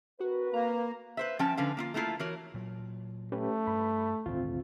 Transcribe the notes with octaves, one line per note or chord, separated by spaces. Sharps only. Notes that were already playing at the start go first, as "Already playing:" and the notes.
C4 F#4 A#4 B4
A#3 A#5
B4 C5 E5
F3 C#4 G5 A5
D3 F3 C#4 B4 F5
A#3 E4 F4
A3 A#3 E4 F4 A4
E3 F#4 A#4 C#5
A#2 F#3
A3 C#4 G4 B4
G2 B5
G#1 D2 A#2 C4 F4